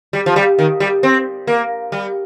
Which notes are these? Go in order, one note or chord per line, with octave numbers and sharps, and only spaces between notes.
G3
F3
G3
D#3
G3
C4
A#3
G3